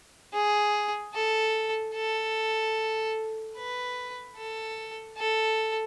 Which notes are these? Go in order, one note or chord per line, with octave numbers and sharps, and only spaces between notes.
G#4
A4
A4
B4
A4
A4